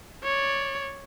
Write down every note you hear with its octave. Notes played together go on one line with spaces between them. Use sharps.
C#5 D5